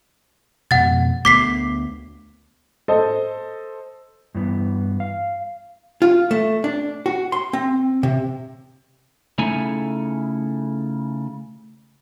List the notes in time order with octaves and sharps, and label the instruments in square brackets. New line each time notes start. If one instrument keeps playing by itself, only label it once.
[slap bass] F2 B2 [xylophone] F#5 A6
[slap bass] D2 A3 B3 [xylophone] D6 B6 C7
[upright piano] A4 C5 D#5
[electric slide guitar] G2 E3 B3
F5
[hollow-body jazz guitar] F4
A3
D4
F#4
C6
C4
C3
[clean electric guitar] C#3 A3 D#4 E4 A4 G#5